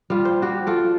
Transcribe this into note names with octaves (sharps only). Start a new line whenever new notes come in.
G3 F4
C5
F#4 G4
F4 A4 D5